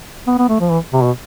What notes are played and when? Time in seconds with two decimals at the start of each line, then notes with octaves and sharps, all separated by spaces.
0.27 B3
0.38 B3
0.49 A3
0.60 F3
0.71 E3
0.93 C3
1.03 B2